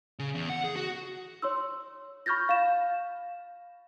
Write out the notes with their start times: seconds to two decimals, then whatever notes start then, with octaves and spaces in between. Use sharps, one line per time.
0.19 C#3
0.35 E2
0.50 F#5
0.64 G#4
0.76 F#4
1.42 C#5 C6 E6
2.26 B5 C#6 F6 G6 A6 A#6
2.49 F5 E7